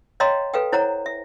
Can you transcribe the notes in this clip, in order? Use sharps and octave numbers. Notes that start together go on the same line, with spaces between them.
C#5 D#5 F5 G5 A#5 C6
A4 B4 F5 G5
E4 C5 C#5 F#5 A#5
E5